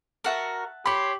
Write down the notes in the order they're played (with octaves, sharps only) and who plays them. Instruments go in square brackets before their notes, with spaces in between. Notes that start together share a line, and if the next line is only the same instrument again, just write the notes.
[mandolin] F#4 A#4 [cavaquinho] E5 F#5 A5
[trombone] G4 [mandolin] C#5 C6 [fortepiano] B5